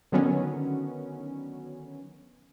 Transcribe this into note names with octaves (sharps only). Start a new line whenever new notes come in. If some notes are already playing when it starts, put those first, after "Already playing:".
D3 D#3 F#3 B3 C#4